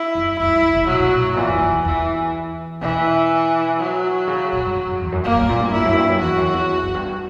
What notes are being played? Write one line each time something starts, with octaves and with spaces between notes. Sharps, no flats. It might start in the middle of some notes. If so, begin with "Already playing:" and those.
Already playing: E4
F#2
F#2 E4
F#2
C#3
C#3
B2 F#3
B2
A#2
G2
A#2 E3
F#2
F#2
E2
E2 E3
B2 E3
F#3
C#3
A#2
G2
G2
F#2
E2
F#2
F#2 A#3
G2
A#2
G2
E2 E4
F#2
G2
F#2
E2 F#4
F#2
E2
F#2
G2